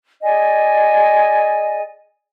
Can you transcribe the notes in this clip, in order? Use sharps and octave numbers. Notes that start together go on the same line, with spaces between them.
G#4 D5 D#5 G#5